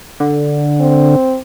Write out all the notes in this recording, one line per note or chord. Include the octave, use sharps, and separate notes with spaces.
D3
C4